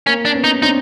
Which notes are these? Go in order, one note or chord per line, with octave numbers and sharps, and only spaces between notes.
A#3 C#4
D4
B3 C#4
D#4
C4 D4 D#4